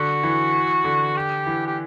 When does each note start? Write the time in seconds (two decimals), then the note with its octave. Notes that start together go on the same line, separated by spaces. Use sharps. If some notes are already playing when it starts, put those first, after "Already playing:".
Already playing: D3 F#4
0.23 E3
0.84 D3
1.16 G4
1.47 E3
1.67 G4